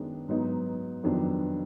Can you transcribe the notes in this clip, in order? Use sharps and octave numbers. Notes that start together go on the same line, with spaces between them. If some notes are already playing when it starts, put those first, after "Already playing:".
Already playing: F#2 D#3 G#3 B3 D4
G#2 F#3 B3 D#4
F2 D#3 F#3 B3 D4